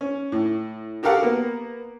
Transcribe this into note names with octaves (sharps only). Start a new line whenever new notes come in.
C#4
A2
F#4 G4 A4 A#4 F5 F#5
A#3 B3